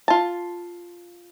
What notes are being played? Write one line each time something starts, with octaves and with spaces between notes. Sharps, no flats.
F4 A5